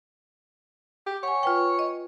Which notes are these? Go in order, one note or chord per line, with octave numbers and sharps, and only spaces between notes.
G4
C#5 F#5 G#5
F4 B4 G5
D#5